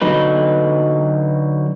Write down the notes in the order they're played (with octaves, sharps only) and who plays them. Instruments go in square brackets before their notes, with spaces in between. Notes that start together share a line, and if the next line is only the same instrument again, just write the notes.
[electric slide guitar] D3 F#3 D#4 B4